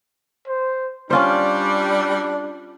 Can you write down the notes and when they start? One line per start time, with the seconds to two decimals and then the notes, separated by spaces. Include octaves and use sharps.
0.47 C5
1.11 G3 C#4 D4 F4 C5